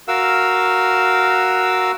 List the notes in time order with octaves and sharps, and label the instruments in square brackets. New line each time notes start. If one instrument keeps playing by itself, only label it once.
[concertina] F#4 A#4 F5 E6